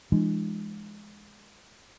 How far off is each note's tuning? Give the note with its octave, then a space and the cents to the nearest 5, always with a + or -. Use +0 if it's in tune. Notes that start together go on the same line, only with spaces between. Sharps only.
E3 +45 G#3 +0 D4 +45